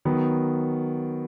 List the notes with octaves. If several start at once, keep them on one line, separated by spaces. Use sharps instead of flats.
D#3 F#3 B3